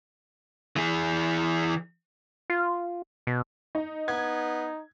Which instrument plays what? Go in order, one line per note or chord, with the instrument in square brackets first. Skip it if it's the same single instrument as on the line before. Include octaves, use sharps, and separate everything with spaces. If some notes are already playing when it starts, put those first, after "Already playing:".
[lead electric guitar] E3 G#4
[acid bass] F4
B2
[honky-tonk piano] D#4
[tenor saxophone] B3 [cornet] D#4 [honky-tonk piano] G#6